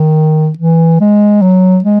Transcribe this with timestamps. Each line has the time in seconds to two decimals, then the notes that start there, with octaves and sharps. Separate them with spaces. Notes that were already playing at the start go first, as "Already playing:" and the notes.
Already playing: D#3
0.58 E3
1.00 G#3
1.41 F#3
1.84 G#3